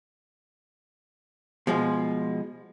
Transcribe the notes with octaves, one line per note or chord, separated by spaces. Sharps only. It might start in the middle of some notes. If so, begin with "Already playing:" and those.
B2 F3 G#3